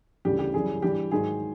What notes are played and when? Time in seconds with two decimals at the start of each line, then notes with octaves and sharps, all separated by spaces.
0.25 D2 C#3 E3 G3 G4
0.39 G4
0.54 F#2 C#3 E3 G3 G#4
0.82 G2 E3 G3 G4
1.12 G#2 D#3 F#3 G#4